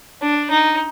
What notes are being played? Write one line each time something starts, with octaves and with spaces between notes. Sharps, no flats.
D4
D#4